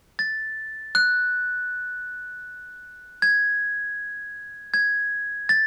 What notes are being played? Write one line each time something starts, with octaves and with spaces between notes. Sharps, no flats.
A6
F#6
G#6
G#6
A6